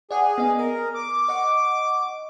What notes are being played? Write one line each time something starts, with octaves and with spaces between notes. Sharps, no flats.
G#4 D5 F#5
B3 D#5
A#4 D#6
D6
D#5 F#5 C#6